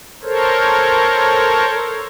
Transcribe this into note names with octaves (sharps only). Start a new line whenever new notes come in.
A4 A#4 C5 C#5